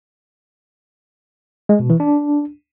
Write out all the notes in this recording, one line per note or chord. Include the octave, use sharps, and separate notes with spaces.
G#3
B2
E3
D4